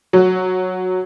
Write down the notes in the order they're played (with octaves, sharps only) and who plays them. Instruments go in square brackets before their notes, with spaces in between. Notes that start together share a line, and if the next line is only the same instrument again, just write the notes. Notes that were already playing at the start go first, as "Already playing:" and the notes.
[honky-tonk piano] F#3